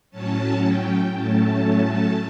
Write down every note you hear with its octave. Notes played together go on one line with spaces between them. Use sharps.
A2 F#3 C#4 A5
G5
A2 F#3 A3 C#4 A5